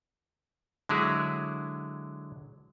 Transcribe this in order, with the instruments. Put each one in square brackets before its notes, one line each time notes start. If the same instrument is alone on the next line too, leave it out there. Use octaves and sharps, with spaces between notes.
[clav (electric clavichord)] D3 F#3 G#3 E4 G#4